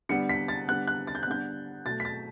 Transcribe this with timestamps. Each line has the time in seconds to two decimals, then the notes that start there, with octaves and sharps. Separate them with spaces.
0.09 D3 G3 B3 C#7
0.29 B6
0.48 A6
0.68 D3 G3 B3 F#6
0.88 F#6
1.07 A6
1.15 G6
1.23 F#6
1.27 D3 G3 B3 G6
1.86 B2 F#3 A3 A6
2.00 B6
2.05 A6